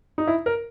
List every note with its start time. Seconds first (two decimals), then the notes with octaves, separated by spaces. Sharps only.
0.18 D#4
0.27 E4
0.46 A#4